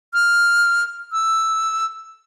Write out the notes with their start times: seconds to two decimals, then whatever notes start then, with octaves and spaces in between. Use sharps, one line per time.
0.14 F6
1.12 E6